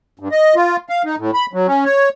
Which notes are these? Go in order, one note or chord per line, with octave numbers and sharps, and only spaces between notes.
G2
D#5
F4
F5
D#4
A2
B5
F#3
C#4
C#5